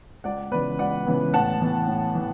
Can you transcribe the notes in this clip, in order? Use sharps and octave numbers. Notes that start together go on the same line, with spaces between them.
C#2 D5 F#5
C#3 E3 B3 B4 D5
C#2 D5 F#5
C#3 E3 B3
A2 F#5 A5
E3 B3
A2
E3